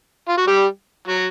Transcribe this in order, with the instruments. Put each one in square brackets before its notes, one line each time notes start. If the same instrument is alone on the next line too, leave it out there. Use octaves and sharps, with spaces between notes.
[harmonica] F4
F#4
G3 G4
F#3 F#4